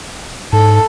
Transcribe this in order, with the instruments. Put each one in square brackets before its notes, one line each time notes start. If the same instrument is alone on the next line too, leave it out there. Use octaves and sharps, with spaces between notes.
[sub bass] G#2 [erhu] A4